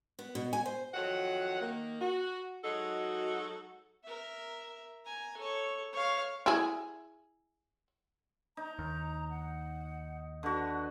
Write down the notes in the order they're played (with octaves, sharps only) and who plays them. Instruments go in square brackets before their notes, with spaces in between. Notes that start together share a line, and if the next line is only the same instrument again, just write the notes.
[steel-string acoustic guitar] B3
B2
G#5
C5
[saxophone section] F2 D#3 F#3 F#5
D#3 A#3
F#4
F#3 G#3 D#4 F#4 A4
[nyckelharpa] A#4 E5
G#5 A#5
A4 C#5
C#5 F5
[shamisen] E4 G#4
[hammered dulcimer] D#4 [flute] A#5
[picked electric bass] D#2
[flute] F#5
[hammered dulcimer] D3 F#4 [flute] B4